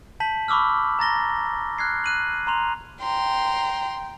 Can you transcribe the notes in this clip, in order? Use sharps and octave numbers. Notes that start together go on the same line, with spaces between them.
A5 G6 B6 F#7
B5 C#6 D6 E6 F6
A#5 A6 A#6 G7
F6 F#6 G#6 C7
F#6 D#7 F#7
A#5 C6 F7
G5 A#5 C6